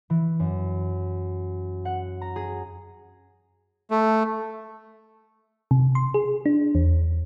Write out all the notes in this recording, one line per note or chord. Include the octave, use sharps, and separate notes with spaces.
E3
F#2
F#5
A#5
G#4
A3
C3
C6
G#4
D4
E2